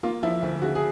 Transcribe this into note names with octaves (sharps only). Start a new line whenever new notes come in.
A#3 F4
F3 E4
D2
C#3 F#4
G#4